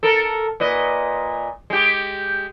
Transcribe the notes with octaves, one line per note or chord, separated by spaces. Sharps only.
A4 A#4
A#2 B4 D#5
G#3 G4